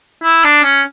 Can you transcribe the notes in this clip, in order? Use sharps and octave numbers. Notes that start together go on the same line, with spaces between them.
E4
D4
C#4